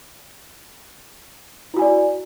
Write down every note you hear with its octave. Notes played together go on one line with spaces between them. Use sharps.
E4 F#4 D5 G#5